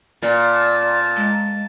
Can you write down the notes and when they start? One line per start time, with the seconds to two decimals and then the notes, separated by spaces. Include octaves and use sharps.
0.23 A#2 D5
0.53 A5
1.17 G#3